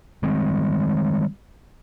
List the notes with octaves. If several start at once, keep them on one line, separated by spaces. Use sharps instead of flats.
D#3 G3 G#3 C4